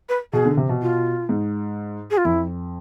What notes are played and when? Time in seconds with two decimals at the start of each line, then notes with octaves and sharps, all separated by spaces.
0.09 B4
0.33 B2 G#4
0.45 D3
0.57 C3
0.69 B2
0.82 F4
1.29 G#2
2.11 G#4
2.17 F4
2.25 F2 E4